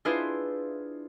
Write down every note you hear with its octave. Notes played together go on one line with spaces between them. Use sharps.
D4 E4 F4 G#4 B4 C5